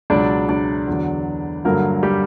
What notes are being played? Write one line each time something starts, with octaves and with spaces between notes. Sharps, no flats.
C#2 B2 F#3 D4 D5
D4 D5
E2 D3 F#3
G2 D3 F#3 A#3 A#4
G3 G4